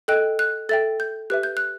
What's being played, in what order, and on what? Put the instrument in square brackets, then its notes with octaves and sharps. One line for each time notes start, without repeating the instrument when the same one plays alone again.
[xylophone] A4 D#5 G5 F#6
F#6
A4 E5 G5 A6
G6
G4 B4 E5 F#6
G6
F#6